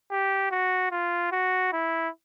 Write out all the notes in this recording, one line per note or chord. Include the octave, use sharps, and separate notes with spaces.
G4
F#4
F4
F#4
E4